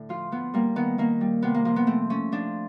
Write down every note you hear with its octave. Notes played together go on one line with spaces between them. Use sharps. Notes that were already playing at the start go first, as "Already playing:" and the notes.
Already playing: A2 D3
F3 F4
F3 B3
G3 A#3
D#3 B3
D#3 A#3
G3
C3 B3
A#3
F3 A#3
B3
A3 C4
A3 C#4
F3 D4